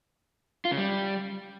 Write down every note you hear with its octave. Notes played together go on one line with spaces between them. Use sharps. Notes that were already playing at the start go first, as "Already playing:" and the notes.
F4
C#3
G3